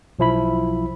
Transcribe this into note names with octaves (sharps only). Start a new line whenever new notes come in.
B1 F3 E4 B5